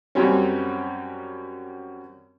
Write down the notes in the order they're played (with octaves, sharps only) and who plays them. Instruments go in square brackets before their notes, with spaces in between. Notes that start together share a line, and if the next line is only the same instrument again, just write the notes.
[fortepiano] F#2 F#3 G3 C4 C#4